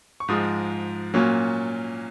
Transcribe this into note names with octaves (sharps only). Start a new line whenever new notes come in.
C#6
G#2 F3 G#3 D#6
A#2 F#3 A#3 C#4